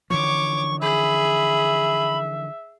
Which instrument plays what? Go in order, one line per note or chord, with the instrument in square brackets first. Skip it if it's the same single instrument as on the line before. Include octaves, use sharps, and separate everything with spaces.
[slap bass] D3 E3 F3 [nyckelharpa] C#5 D6 [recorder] C#6
[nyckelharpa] G#4 [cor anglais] E5 [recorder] B5